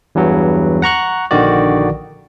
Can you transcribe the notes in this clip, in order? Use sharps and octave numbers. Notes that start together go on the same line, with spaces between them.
E2 G2 E3 F#3
F#5 A#5 C#6 F#6
A#1 D3 D#3 F#4 D5